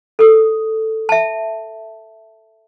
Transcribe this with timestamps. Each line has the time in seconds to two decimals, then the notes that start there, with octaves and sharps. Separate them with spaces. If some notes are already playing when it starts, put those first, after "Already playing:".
0.19 A4 D#6
1.09 E5 A5